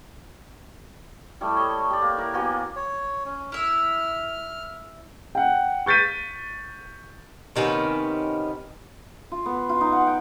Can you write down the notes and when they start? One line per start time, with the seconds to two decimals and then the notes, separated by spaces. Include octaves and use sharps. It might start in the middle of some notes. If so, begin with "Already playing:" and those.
1.41 G3 A3 E4
1.56 C#5 D#5
1.90 G4 D5
2.02 A#3
2.17 E4 A#4 A#5
2.33 A#3 B3 F#4 G#5
2.76 C#5
3.26 C#4
3.52 E4 E5 F6
5.35 F#5 G5
5.86 C#6 G6 A6 B6 D#7
7.56 C3 D#3 B3 C#4
9.32 F4
9.46 B3
9.69 F4
9.81 D#4
9.92 F#5
10.07 G5